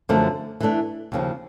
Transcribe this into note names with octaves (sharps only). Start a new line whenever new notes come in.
F#2 D3 F3 A3
E3 A3 D4
D#2 C#3 F3